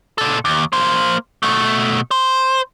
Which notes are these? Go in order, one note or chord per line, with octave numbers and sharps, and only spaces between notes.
A#2 A4
D#2
A#3 C5
B2 A3
C5